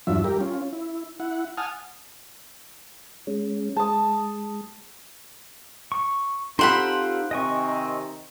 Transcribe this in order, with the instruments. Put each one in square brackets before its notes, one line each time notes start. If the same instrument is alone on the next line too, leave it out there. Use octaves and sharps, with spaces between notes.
[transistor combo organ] E2 G2 F#3 D4 F4 E5
G3 G4 A#4
C#4 F4
E4
E4 F#5
F#5 G#5 A5 D#6 F6
[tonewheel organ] G#3 C#4
[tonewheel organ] G#3 [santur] A5 D#6
[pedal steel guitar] C#6
[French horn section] C4 F4 [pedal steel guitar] D#4 G4 A4 [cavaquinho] C5 F#5 B5
[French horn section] C3 D#3 C4 [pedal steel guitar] D#5 G#5 C#6